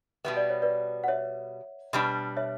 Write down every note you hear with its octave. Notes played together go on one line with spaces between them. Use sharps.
B2 G3 B3 E5
D5
C#5
B4 D5
F#5
C#5 E5
B2 G3 D4
C#5 E5